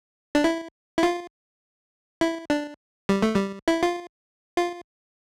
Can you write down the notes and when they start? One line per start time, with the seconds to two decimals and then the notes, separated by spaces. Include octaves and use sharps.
0.35 D4
0.44 E4
0.98 E4
1.03 F4
2.21 E4
2.50 D4
3.09 G3
3.22 A3
3.35 G3
3.68 E4
3.83 F4
4.56 F4